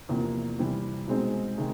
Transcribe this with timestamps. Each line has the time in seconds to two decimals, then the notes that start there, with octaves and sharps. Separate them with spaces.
0.09 E2 C3 F3 A#3
0.59 C3 E3 G3
1.07 B2 G#3 C4 D#4 G#4
1.57 C3 D#3 G#3